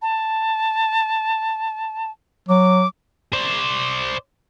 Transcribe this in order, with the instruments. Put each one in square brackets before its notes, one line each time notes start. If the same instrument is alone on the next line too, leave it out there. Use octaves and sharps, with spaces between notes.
[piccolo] A5
[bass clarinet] F#3 [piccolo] D6
[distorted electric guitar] C5 D5